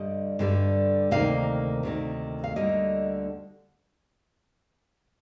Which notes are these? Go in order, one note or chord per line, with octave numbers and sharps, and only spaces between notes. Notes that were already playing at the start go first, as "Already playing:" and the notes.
Already playing: G2 D3 G3 D#5
G2 D3 G3
D2 C3 D#3 A#3 F5
D2 C3 D#3 A#3
F5
D2 D3 G3 A#3 D#5